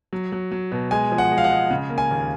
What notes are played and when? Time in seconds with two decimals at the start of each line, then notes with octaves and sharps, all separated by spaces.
0.13 F#3
0.32 F#3
0.52 F#3
0.72 B2
0.91 G#3 G#5
1.12 F3
1.18 F#5
1.31 G#3
1.38 F5
1.44 F#5
1.51 G#3
1.70 C#3
1.90 A#3
1.98 G#5
2.11 D#2